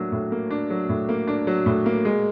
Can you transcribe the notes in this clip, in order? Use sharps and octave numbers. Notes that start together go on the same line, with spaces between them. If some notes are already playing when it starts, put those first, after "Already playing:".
Already playing: A2 F#3 A#3 D4
A2
A#3
D4
F#3
A2
A#3
D4
F#3
A2
A#3
G#3